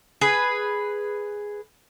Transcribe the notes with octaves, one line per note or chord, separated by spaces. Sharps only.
G#4 B4